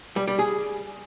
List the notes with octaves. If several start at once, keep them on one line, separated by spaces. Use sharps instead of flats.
G3
G3
G#4